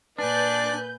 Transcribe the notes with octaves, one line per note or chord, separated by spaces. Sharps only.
A#2 D4 B4 D5 G#5 F#6 G6